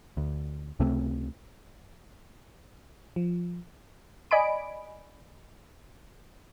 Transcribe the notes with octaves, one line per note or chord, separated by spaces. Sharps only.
D2
C#2 C3 A3 C4
F3
D5 D#5 G#5 B5 D7